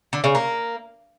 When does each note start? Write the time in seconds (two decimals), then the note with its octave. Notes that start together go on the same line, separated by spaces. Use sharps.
0.13 D3
0.24 C#3
0.35 A#3